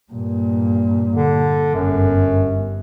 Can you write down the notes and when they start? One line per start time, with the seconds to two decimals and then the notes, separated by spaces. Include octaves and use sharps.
0.12 G2 A#2
1.16 D3
1.75 G1 F#2